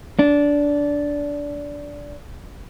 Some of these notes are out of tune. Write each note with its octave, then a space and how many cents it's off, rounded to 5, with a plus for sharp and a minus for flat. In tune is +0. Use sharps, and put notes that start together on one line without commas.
D4 -15